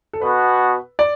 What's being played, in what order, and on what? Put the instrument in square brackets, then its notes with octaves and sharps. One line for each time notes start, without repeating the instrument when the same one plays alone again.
[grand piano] A4
[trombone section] B2 B3 F#4 [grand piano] B4
[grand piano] D5